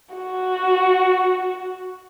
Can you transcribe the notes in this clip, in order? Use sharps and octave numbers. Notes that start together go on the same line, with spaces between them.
F#4